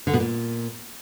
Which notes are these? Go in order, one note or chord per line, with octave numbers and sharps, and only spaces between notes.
D3
B2
A#2